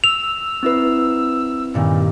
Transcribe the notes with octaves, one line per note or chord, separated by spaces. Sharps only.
E6 F7
C4 E4 B4
G2 A#2 D#3